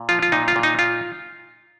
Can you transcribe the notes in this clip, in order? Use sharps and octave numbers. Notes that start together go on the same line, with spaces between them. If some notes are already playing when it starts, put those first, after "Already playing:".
Already playing: A#2
F3 F4
F4
A#2 D#4
F4
A#2
D#4
F4